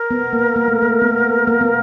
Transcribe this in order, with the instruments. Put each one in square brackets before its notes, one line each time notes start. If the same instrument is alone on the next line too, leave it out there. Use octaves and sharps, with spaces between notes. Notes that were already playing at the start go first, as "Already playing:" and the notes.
Already playing: [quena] A#4
[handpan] B3
A#3
A#3
A3
A#3
B3
A#3
B3